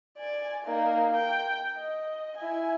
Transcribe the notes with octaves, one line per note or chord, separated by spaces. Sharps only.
D5 G#5
A#3 D#4
G5
D#5
E4 G#5